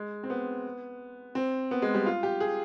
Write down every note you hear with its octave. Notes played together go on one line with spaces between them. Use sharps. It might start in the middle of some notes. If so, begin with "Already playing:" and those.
Already playing: G#3
C4
B3
C4
B3
G#3
G3
F4
G4
G#4